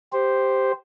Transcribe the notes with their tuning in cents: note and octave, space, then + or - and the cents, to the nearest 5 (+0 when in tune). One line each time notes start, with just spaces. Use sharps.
G4 +0 C5 +0